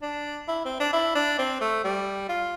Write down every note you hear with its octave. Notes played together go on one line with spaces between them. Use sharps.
D4
E4
C4
D4
E4
D4
C4
A3
G3
F4